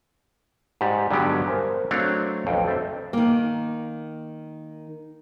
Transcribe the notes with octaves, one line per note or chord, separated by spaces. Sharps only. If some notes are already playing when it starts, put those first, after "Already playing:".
G#2 G4 D5
G2 D3 F#3 G#3 B3 G4
A#4 C5 G#5 A#5
F#3 A3 C4 D4 C#5 F5
B1 F2 G5
A4 C5 D#5 E5
D#3 A#3